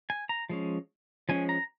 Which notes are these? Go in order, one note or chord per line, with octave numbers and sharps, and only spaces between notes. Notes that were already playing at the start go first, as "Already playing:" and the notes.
G#5
A#5
F3 G#3 C#4
F3 G#3 C#4 G#5
A#5